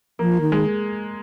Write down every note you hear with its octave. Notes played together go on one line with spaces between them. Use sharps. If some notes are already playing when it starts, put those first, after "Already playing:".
F3 A#3
D#3
G#3